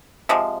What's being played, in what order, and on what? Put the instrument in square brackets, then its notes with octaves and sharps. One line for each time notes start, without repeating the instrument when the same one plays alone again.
[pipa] C3 F3 G#3